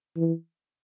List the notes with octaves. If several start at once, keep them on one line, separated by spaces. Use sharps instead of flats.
E3